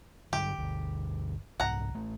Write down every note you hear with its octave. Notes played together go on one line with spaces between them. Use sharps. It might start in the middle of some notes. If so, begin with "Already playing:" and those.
G2 D3 F#3 G4
G1 D2
C2 G#2 F#5 A#5
A1 A3